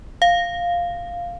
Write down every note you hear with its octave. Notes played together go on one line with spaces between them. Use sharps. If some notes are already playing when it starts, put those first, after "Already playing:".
F5